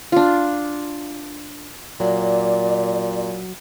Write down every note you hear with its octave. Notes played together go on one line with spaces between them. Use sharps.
D4 F4
A#2 F#3 D5